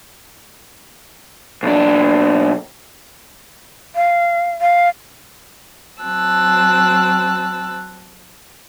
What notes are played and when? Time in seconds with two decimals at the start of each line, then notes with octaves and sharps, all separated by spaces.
1.63 B1 D4
3.96 F5
4.61 F5
6.01 F#3 C4 A5 E6 F#6